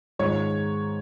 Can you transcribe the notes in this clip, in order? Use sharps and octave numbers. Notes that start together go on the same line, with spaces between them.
G#2 D#3 G#3 F4 C#5